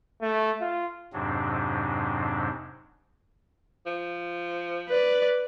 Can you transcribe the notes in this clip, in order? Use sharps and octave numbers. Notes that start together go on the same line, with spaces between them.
A3
F4
F2 G#2 C3 F#3 C4 D4
F3
B4 D5